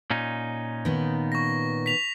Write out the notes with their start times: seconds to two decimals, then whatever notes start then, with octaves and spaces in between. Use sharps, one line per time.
0.10 A#2 C#4 D#4
0.85 D#3 B3
1.32 C#6 A#6
1.86 B6 F7